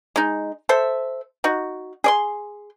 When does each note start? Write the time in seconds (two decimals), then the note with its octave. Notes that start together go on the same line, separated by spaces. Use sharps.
0.16 G#3 D#4
0.69 A4 C5 E5
1.44 D#4 F#4
2.04 G#4 D5 C6